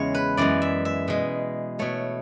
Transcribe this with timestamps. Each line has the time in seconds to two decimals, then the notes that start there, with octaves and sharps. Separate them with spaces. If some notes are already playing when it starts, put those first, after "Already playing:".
Already playing: E2 C#3 E3 G#3 C#5
0.14 B4
0.37 F#2 E3 G#3 D5
0.62 E5
0.85 E5
1.08 B2 G#3
1.79 B2 A3 C#5